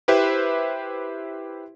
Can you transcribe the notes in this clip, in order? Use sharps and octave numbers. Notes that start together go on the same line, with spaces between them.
E4 G4 B4 C5 E5